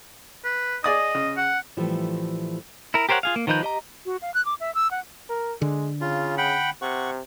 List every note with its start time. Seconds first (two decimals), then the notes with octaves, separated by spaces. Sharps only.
0.45 B4
0.84 G#4 D5 D#5 D#6
1.15 C#3
1.37 F#5
1.77 A2 E3 F3 G3 A3
2.94 E4 A#4
3.09 G4 A#4 C5 C#5 F#5
3.23 F4 G#4 F5
3.36 A#3
3.47 D#3 F3 D#4 B4 G6
3.63 G4 D#5 A#5
4.06 F#4
4.22 F5
4.34 F#6
4.45 D6
4.60 E5
4.75 E6
4.91 F#5
5.29 A#4
5.62 D3 G#3
6.01 C#3 F4
6.38 F#5 G5 B5
6.82 C3 F#5 C#6